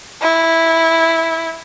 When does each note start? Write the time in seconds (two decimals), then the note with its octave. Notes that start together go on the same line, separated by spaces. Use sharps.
0.22 E4